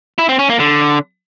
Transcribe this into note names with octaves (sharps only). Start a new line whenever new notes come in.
E4
C4
C#4
A#3
D3